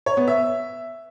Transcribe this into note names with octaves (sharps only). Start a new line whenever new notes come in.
C#5
B3
E5